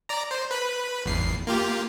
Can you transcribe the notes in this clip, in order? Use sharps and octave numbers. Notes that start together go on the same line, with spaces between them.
D5 A#5
C5
B4 B5
G#1 E2 C7
A#3 F4 G4